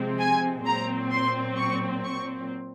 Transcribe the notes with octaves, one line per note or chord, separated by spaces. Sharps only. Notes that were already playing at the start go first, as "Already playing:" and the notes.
Already playing: C3 F3 G#3 C4
G#5
A#2 F#3 C4 A#5
C6
C#6
C#6